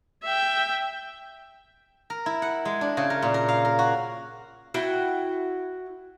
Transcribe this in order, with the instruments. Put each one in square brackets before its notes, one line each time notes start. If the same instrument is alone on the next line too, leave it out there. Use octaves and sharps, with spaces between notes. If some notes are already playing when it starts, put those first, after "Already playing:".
[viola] E5 G5
[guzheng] A#4
E4
F#5
G#3
D4
C#3
A#4
A#2
A#4
F5
A#4
F#4
[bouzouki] E4 F#4 F#5 G5